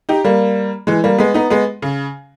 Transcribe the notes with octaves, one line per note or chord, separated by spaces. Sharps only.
D#4 G4
G3 A#3
E3 G#3
G3 A#3
G#3 B3
B3 D#4
G#3 B3
C#3